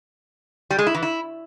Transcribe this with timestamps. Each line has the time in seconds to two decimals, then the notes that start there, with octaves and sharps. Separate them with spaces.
0.71 G3
0.79 G#3
0.87 E4
0.95 E3
1.03 E4